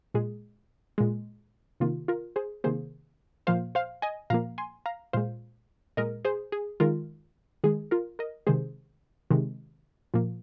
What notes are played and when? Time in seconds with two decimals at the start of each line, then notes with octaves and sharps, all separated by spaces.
0.14 A#2 G#3 G#4
0.98 A#2 G#3
1.80 C3 D#3 A#3 F4
2.08 F4 A#4
2.36 G#4 C5
2.64 C3 D#3 A#3 G#4 C5
3.47 A#2 F3 A#3 C5 F5
3.75 C5 F5
4.02 D#5 G#5
4.30 A#2 F3 A#3 F5 A#5
4.58 G#5 C6
4.86 F5 A#5
5.13 A#2 G#3 C5 F5
5.97 A#2 G#3 A#4 D#5
6.25 G#4 C5
6.52 G#4
6.80 D#3 G#3 F4 A#4
7.64 D#3 G#3 G#4
7.91 F4 A#4
8.19 A#4 D#5
8.47 C3 D#3 G#3 G#4 C5
9.31 C3 D#3 G#3
10.14 A#2 F3 A#3